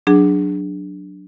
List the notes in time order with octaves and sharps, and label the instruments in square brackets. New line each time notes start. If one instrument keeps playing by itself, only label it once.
[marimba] F#3 D4 G#4